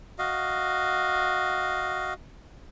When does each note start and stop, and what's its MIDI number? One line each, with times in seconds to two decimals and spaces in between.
0.19 2.13 66
0.19 2.13 75
0.19 2.13 77